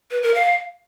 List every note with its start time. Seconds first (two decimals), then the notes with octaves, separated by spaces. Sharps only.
0.11 B4
0.23 A#4
0.34 F5